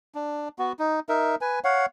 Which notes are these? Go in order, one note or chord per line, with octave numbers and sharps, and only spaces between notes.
D4
B3 F#4
D#4
D#4 A#4 E5
B4 G#5
C#5 F5 F#5